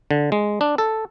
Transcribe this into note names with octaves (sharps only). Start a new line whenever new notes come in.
D3
G#3
D4
A4